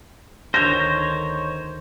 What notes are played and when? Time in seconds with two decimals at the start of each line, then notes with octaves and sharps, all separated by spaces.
0.54 D2 D#3 C5 C#5 G6 A#6